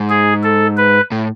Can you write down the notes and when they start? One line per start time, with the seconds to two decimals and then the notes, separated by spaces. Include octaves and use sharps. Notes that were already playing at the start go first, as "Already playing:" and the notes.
Already playing: G#2
0.10 G#4
0.44 A4
0.77 B4
1.12 A2